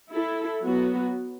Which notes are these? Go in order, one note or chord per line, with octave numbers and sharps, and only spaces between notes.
E4 A4
F#3 B3 F#4